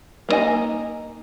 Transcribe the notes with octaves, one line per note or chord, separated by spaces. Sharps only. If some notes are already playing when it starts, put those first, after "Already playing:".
A#3 B3 D#4 D#5 G#5